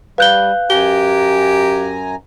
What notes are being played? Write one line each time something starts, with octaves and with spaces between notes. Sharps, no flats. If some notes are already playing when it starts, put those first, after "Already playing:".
G3 B4 F5 F#6 G6 G7
F#2 G4 G#5 A#5 G7